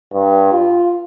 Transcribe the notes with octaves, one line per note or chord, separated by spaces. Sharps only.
G2
F4